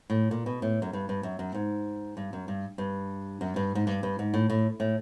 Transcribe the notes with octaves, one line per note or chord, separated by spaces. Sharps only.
A2
A#2
B2
A2
F#2
G2
G2
F#2
F#2
G#2
G2
F#2
G2
G2
F#2
G2
G#2
G2
G2
G#2
A2
A2
A2